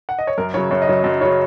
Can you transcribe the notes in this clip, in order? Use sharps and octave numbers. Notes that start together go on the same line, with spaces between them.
F#5
D#5
C#5
F#2 A#4
C#3 F#3 C#5
F#2 C#5
D#5
C#3 F#3
F#2 D#5
C#3 F#3 C#5